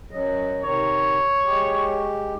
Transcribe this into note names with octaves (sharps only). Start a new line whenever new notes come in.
F#2 F#3 D#5
C3 D#3 C#5 A#5
G#3 G4